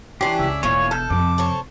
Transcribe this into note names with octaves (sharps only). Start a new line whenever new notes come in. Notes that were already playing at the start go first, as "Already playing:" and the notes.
E3 C#4 D4 G4 C6
C#2 E5
E1 B2 E3 F3 A#3 C#5 G#5
A4 A5 F6 G6
F2 C3 D6
A4 C5 C#5